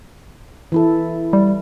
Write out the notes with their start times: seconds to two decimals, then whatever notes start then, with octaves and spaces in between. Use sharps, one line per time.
0.72 E3 E4 A4
1.33 G3